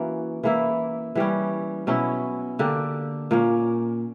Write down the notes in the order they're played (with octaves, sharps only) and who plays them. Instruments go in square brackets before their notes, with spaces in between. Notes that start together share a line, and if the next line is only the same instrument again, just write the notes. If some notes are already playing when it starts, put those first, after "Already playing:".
Already playing: [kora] E3 A#3 C#4 F#4
E3 A#3 E4
E3 G3 C#4
B2 F#3 C#4 E4
D3 A#3 D4 G4
A#2 A#3 C#4